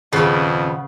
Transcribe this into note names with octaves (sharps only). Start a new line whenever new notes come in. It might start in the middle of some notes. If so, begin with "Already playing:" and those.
D#1 F2 C#3 B3 G#4 B4 C7